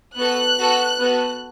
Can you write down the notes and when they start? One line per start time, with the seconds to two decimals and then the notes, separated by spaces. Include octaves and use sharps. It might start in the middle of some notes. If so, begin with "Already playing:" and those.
0.17 B3 F#4 A4 F#6
0.59 B3 F#4 A4
0.99 B3 F#4 A4